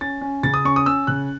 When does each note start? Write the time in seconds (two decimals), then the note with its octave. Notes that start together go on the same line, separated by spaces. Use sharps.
0.01 C#4 A6
0.21 C#4
0.43 C#3 A6
0.54 D#6
0.65 C#4 C#6
0.76 D#6
0.86 C#4 E6
1.07 C#3 F#6